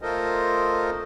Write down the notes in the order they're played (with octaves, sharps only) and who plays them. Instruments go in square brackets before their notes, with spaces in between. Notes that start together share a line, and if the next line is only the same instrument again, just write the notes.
[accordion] A3 F4 A4 A#4 C5 D#5